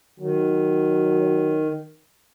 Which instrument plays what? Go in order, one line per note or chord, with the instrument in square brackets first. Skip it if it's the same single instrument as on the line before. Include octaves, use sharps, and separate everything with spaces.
[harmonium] D#3 [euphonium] F#3